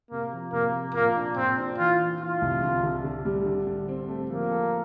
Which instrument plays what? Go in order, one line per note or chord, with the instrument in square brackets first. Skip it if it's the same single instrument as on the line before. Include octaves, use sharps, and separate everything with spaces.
[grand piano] C3 [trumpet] A#3
[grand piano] F3
[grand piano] C3 [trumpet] A#3
[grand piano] F3
[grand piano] A#2 [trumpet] A#3
[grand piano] D4
[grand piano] A#2 [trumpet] C4
[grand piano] D4
[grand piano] E3 [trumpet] F4
[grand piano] E3
[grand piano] E3 [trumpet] F4
[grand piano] C2
D3
D3
D3
G3
D3
D3
C4
A3
[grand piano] F3 [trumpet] A#3
[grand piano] A4